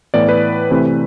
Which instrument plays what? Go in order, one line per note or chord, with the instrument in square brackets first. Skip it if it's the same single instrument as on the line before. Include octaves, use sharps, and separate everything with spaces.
[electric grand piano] A2 E3 B3 D5
B4
C3 E3 A3 C4